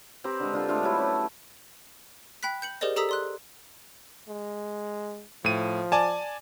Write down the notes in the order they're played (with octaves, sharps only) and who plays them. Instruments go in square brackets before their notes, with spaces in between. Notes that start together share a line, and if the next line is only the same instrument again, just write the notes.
[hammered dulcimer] C4 G4 B4 A#5
D3 G#3
D3 F4 A4
G#3 A3 D4 F4
F#3 G3 E4 A4
C#4
[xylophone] G5 B5 F#6 B6
G6 C#7 F#7
G4 G#4 A#4 C5 D5 D#5
G4 A4 A#5 D#6 E6 B6
D5 C6 F#6
[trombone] G#3
[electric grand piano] A2 D#7 [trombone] F3
[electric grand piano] D5 G#5 A5